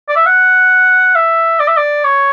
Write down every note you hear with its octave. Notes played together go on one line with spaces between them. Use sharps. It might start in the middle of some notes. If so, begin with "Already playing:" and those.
D5
E5
F#5
E5
D5
E5
D5
C#5